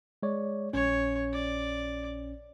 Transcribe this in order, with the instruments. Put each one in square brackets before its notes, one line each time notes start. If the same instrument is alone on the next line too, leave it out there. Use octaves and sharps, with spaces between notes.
[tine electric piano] G#3 C#5 D5
[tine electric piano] A#1 C#4 [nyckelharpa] C#5
[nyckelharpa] D5